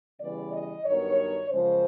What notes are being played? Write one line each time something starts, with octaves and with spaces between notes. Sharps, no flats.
C#3 E3 G3 B3 D5
D#5
G2 D#3 F#3 B3 C#5
F#2 C#3 F3 G#3 C5